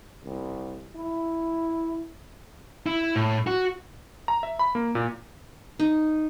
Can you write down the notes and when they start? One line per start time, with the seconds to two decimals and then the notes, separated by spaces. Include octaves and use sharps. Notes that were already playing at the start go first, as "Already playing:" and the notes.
0.24 C2
0.96 E4
2.86 E4
3.16 A2
3.47 F#4
4.28 A#5
4.43 E5
4.59 B5
4.75 A#3
4.95 A#2
5.80 D#4